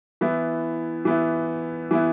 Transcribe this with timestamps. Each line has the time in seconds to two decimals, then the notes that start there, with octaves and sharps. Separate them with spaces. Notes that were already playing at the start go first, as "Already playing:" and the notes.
0.21 E3 B3 E4
1.05 E3 B3 E4
1.91 E3 B3 E4